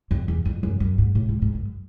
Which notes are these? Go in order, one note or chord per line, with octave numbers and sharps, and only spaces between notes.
F2
E2
F2
F#2
F#2
G#2
A2
G#2
G#2
F#2